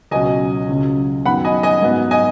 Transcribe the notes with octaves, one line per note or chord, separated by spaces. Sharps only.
C#2 B2 F#3 C#4 D#5 G#5
C#2 C#3 F#3 C#4
F#2 D#3 B3 F#5 B5
D#5 G#5
D#5 G#5
G#2 F#3 B3
D#5 G#5